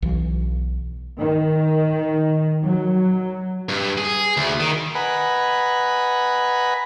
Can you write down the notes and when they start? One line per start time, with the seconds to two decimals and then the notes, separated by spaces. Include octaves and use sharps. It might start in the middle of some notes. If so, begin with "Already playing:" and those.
0.02 B1 E3
1.18 D#3
2.63 F#3
3.69 G2
3.98 G#4
4.37 D2
4.60 D#3
4.95 B4 D#5 F#5 G#5 A#5 B5